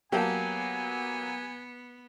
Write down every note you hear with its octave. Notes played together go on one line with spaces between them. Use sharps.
F#3 A#3 B3 G4 G#5 A5